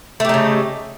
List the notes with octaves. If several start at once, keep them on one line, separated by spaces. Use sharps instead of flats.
C#3 A3 D#4 G4